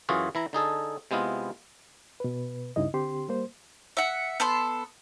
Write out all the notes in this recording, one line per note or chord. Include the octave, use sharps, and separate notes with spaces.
F#2 E3 F4 F#4 G#4
E3 E4 A#5
D3 D#4 G#4 A4
C3 G#3 B3 E4 F4
B2 B4
C#2 G2 C#3 D#4 E4 D#5
D3 C4 G4 C6
G3 A#3 C5
E5 F#5
B3 A4 C6